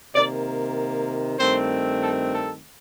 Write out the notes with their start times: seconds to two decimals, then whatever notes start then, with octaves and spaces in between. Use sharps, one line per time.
0.15 C3 D#3 A#3 D5
1.40 G2 D#3 A3 C4 C5
2.03 A4
2.34 A4